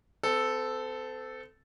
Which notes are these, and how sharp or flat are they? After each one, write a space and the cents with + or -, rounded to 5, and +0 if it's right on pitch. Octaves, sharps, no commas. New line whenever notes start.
C4 -35 A4 -5